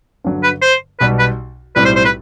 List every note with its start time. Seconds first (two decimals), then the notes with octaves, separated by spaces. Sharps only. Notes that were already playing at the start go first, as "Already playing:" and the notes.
0.24 G2 D3 F#3
0.43 B4
0.62 C5
1.00 B1 B2 G3 B4
1.19 B4
1.76 B1 A2 G3 C4 E4 B4
1.85 C5
1.95 C5
2.05 B4